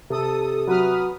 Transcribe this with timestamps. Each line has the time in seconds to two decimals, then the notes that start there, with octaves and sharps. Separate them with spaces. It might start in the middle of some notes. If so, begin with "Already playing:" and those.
0.10 C3 A4 D#6
0.67 F#3 B4 D#6 F6